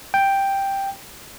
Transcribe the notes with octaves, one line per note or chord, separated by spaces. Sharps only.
G5